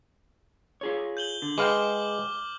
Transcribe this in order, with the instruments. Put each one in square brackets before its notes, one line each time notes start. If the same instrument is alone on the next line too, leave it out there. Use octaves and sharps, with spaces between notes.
[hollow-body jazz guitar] F4 G#4 C#5
[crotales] G6 F#7 G7
[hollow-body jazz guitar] D3
[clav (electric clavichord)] G#3 F5 G5 [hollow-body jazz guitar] B4 [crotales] D6 F6